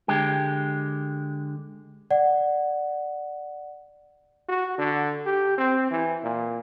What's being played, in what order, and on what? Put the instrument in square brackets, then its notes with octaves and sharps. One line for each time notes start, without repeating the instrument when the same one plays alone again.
[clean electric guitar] D3 G#3 G4
[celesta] D5 F#5
[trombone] F#4
D3
G4
C4
E3
A#2